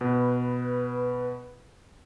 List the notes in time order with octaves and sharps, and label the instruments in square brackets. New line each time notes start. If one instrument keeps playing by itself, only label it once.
[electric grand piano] B2 [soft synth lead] B4